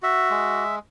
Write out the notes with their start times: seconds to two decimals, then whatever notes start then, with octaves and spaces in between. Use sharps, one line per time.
0.02 F#4 E5
0.30 G#3